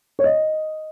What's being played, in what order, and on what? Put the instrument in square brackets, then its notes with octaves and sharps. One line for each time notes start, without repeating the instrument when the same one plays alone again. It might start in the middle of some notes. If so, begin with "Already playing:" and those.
[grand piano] C#5
D#5